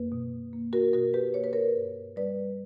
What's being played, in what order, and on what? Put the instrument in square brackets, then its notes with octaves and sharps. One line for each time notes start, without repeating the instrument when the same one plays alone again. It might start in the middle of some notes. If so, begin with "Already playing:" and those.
Already playing: [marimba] F#2 A#3 B4
B2
A#3
F#4 A#4
B2 F#4 A#4
G4 B4
A#3 C#5
B4
A#4 C#5
G2
G3 B4 D5